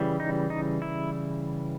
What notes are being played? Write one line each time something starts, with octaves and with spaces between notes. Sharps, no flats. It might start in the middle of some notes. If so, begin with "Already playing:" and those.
Already playing: C#3 E3 G3
D#4
D#4
E4